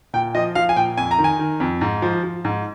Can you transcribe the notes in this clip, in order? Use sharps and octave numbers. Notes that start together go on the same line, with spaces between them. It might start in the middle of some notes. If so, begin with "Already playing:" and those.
A#2 G5
F3 D#5
F3 F5
G#5
A#2 G5
F2 G#5
A#5
D#3
G#5
D#3
F2
G#2
F3
F3
G#2